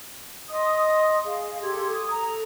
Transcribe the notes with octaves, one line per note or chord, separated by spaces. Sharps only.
D#5 C6 D#6
G#4 F5
G4 A4 C6 G#6
D#6
A4 A#5